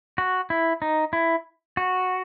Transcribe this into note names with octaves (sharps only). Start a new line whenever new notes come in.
F#4
E4
D#4
E4
F#4